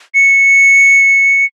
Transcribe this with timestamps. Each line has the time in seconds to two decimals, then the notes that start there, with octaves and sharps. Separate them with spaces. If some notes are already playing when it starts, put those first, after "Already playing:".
0.15 C#7